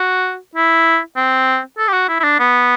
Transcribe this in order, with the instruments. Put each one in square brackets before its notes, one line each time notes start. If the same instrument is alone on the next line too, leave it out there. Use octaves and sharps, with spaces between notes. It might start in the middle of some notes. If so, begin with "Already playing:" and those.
Already playing: [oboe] F#4
E4
C4
A4
G4
F#4
E4
E4
D4
B3